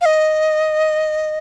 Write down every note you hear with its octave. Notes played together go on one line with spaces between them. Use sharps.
F5
D#5